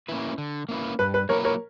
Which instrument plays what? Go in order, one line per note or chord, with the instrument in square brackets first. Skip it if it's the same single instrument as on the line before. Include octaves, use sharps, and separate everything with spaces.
[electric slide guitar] A#3 C#4 E4 B4
D3
A#3 C#4 E4 B4
[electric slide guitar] G2 [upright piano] B4
[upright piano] B4
[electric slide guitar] F#3 A#3 E4 B4 [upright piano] A#4 C#5
[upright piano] A#4 C#5